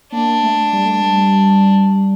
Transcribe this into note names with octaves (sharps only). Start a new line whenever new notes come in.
A#3 D4
A3
G3
A3
G3